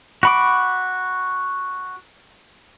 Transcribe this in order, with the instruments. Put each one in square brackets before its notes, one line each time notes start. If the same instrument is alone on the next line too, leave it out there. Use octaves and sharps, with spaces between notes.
[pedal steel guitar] F#4 B5 D6